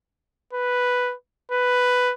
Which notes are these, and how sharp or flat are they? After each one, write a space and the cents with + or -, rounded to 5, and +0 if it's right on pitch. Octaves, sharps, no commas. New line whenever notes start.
B4 +0
B4 +5